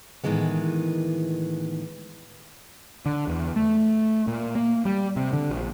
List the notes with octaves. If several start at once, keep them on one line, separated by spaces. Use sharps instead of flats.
A2 D#3 E3 G#3 B3
D3
E2
A3
A#2
A#3
G3
C3
D3
A#1